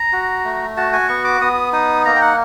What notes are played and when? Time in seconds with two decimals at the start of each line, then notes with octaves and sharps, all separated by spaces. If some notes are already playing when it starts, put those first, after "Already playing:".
Already playing: A#5
0.13 F#4
0.44 A3
0.77 F#4 A5
0.93 G#5
1.08 B3 C#6
1.24 D6
1.41 B3 D#6
1.72 D#4 D#6
2.05 A#3 A#5
2.15 G5
2.22 F#5